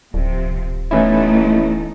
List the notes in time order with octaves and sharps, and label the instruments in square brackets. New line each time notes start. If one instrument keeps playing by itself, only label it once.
[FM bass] D1 [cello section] C3 F3
[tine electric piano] E3 C#4 E4 [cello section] A3 B3 D#4